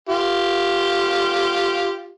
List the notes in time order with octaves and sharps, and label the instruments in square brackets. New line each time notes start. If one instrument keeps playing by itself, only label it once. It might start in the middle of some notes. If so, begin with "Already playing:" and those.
[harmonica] F4 G4